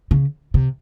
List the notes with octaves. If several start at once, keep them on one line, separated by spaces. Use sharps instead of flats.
C#3
C3